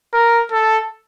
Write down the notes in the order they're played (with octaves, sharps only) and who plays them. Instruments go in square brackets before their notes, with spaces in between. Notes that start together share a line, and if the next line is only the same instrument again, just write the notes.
[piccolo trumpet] A#4
A4